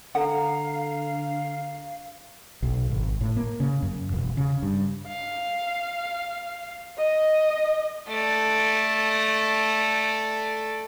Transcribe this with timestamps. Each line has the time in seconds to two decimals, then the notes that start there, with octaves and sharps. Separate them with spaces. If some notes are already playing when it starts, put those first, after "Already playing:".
0.15 D3 A4 F5 F#5 A#5
2.62 B1
2.91 G#1
3.21 A2
3.37 A#3
3.60 C#3
3.82 F#2
4.12 E1
4.37 C#3
4.62 G2
5.07 F5
6.97 D#5
8.07 A3 D5